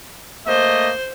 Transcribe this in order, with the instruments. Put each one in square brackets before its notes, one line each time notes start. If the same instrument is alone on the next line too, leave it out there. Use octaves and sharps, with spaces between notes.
[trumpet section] A3 A#3 D#5 [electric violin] C5